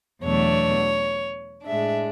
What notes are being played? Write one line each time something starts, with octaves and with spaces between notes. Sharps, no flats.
E2 B2 F#3 A3 D4 C#5
A2 G#3 D4 E5